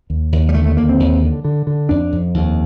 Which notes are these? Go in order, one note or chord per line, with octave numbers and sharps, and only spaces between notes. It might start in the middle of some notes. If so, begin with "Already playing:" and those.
D#2
D#2
G3
D3 A3
A3
D#2 A#3
C4
D#2
D3
D3
D3
F2 D4
F2
D#2